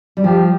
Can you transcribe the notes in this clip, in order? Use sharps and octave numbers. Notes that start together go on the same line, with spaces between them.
G3
F3 G4